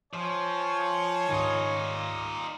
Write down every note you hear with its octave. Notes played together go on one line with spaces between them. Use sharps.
F3 C#5 G#5
C#2 G#2 D#3 D#4 F4